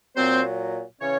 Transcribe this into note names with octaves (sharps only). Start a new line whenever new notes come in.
A#2 F#3 C4 C5
C#3 E3 C#4 C#5